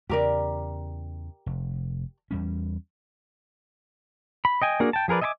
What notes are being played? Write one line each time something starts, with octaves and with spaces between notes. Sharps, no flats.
E2 C#3 G4 A#4 D5
F1
E2 G3 C#4
B5
D#5 G5 G#5
A#3 D4 F#4 G#4 A#4
G5 A5
F3 G#4 A#4 B4 D5
D#5 E5 G#5 B5 D6